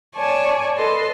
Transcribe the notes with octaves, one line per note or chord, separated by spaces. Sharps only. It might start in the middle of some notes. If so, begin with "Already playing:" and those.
C#5 D5 G#5 A5
A4 B4 D#5 C6